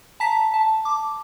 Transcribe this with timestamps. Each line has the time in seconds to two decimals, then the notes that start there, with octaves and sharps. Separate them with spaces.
0.20 A5 A#5 B6
0.54 A5
0.85 D6